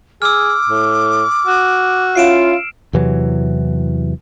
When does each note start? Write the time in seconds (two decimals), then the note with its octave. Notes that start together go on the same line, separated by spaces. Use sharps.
0.22 G#4 D6 E6 F6
0.68 A2
1.47 F#4
2.15 C#4 E4 F4 C7 D7 E7
2.93 E2 C3 E3 F#3